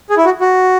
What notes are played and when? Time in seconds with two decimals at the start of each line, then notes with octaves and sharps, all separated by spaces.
0.10 G#4
0.17 E4
0.25 F#4
0.41 F#4